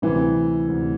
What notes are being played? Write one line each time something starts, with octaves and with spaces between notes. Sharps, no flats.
D2 C3 E3 G3 C4 G4
D2 C3 G3 C4 G4